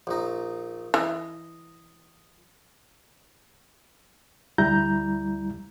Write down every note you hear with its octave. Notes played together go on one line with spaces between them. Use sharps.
A#1 D#4
E3 D#5
D2 G3 E4 A#5 G6